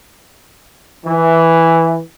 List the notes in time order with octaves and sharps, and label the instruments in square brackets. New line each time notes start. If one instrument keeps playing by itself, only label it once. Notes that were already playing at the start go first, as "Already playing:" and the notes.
[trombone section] E3